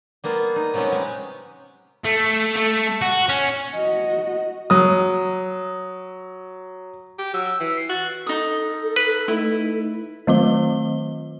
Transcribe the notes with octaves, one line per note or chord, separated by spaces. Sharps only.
G3 A#3 B3 F4
D#4
C3 F#3 B3 C#4 G4
G#3 G4
A3
A3
F#4
C#4
F#4 D#5
F#3 D#6
G4
F#3 E6
E3
C7
F#4 A6
D#4 A4 D#6
B4
A3 D#4 E4
D#3 F#3 F4 G7